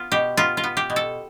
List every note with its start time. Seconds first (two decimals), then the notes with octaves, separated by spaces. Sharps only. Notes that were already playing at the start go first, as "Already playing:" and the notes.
Already playing: B3 F4
0.12 B2 G4
0.37 B3 F4
0.57 F4
0.64 B3
0.77 G4
0.90 B2
0.96 A4